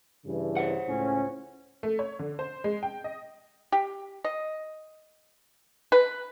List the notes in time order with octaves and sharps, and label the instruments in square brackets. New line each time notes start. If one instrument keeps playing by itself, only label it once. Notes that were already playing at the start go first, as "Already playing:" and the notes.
[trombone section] G2 C#3 E3
[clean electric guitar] C5 C#5 F#5
[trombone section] C#2 A2 C#4
[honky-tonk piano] A3
C#5
D3
C5
G#3
G5
D#5
[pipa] G4
D#5
B4